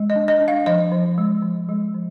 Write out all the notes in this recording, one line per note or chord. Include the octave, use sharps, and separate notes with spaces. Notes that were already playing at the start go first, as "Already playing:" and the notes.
Already playing: G#3
D#5
D4
D#5
D4
F5
F3 D#5
F3
G#3
F3
G#3
F3